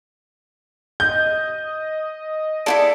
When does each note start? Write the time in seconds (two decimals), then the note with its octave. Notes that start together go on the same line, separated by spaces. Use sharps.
1.00 D#5 G6
2.66 E4 F4 G#4 A4 D5